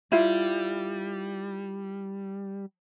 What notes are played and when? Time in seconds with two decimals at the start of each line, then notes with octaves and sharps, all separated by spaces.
0.12 G3 E4 F4